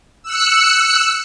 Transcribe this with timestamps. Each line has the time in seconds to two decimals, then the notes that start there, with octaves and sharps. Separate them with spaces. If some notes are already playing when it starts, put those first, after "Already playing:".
0.23 E6 F#6 C#7